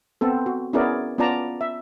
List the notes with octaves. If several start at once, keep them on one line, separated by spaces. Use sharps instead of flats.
B3 C4 A4
F#4
B3 C#4 E4 G#4 A#4 D5
B3 C#4 F4 D5 A5 A#5
E5